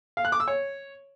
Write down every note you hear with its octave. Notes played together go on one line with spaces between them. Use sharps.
F5
F#6
D6
E6
C#5